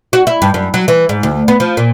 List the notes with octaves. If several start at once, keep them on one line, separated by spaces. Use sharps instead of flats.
F#4
E4
G2
F#2
F#3
E3
G#2
D2
B3
F3
A#2